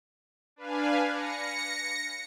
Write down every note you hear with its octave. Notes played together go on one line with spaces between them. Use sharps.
D4 B4 F5 G#5
A#6 C#7